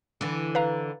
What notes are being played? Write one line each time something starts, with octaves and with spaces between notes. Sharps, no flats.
D3 E3
B4 F5 A#5